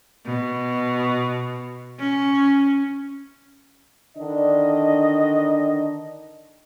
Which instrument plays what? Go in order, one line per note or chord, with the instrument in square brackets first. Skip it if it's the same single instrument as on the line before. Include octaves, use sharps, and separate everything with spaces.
[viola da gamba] B2
C#4
[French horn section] D3 D#3 D4 [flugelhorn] D#5